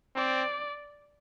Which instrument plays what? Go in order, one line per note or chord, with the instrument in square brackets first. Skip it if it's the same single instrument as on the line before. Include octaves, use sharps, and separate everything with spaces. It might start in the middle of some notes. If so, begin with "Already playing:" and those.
[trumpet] C4 [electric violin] D5